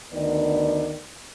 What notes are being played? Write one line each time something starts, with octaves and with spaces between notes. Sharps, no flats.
D2 D#3 B3 D5